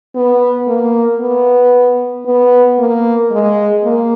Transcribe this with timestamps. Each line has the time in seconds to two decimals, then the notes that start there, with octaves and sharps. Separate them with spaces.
0.15 B3
0.68 A#3
1.20 B3
2.26 B3
2.79 A#3
3.31 G#3
3.84 A#3